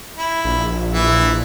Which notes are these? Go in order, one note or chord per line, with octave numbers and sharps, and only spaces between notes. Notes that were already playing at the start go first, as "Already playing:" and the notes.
E4
A#1
E3 E5